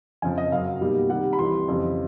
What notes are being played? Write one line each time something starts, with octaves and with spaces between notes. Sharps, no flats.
F2 C#3 F3 G#5
D#5
F#2 C#3 F#3 F5
B2 G3 A#3 D#4
C3 D#3 G3 F#5
B5
C2 C3 E3 G3 C6
F2 C#3 E3 G3 C4